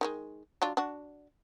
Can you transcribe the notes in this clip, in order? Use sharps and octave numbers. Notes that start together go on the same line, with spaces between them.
D#3 G3 G#3
F#3 D4 F4
D4 F#4